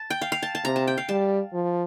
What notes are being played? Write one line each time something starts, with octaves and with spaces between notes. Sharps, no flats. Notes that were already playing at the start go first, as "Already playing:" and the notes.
Already playing: A5
G5
F5
F5
A5
A5
C3 A#5
A5
G5
F5
G3 A5
F3